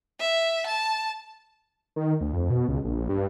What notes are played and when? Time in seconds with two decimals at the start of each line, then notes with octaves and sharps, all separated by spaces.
0.19 E5
0.66 A5
1.96 D#3
2.21 D2
2.33 F2
2.50 B2
2.68 C#2
2.84 A#1
3.09 G2